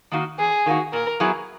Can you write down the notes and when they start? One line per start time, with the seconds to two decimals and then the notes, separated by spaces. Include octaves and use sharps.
0.11 D#3 A#3 D#4 F#4
0.39 E2 G#4
0.66 D#3 A#3 D#4 F#4
0.93 A#2 A#4
1.20 F#3 B3 E4 G#4